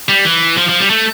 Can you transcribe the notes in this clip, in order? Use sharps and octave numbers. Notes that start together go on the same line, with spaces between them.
G3
E3
F3
F3
G3
A3